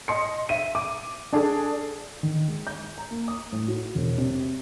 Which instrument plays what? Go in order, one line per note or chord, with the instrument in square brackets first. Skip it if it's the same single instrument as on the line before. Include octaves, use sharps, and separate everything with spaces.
[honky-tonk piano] D#5 C6 C#7
E5 D#7
D6
D4 G#4 A4
[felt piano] D#3
G#3
G6
A#5
A#3
D#6
A2
F#4
E1
C3